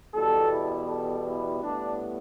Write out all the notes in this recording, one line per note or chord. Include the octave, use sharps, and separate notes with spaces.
E2 B2 G3 A4
E4
A4
E4
A2 G3 B3 D4